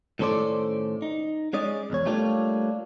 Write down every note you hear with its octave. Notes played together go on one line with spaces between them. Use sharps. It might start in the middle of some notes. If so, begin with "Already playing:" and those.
A2 D#3 C#4 A4 C5 D5
D#4
G#3 C#4 D5 D#5
B1 E2 C#5
G3 A3 A#3 D4 F4 C#5